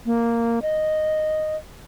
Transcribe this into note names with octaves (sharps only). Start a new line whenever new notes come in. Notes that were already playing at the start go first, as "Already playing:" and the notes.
A#3
D#5